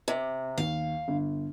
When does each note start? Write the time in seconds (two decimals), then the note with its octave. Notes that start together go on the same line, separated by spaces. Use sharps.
0.08 C3
0.58 D#2 F5
1.08 G1